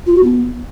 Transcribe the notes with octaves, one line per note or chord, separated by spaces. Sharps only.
F4
F#4
B3